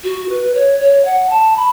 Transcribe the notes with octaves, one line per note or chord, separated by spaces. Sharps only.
F#4
B4
C#5
C#5
F#5
A5
B5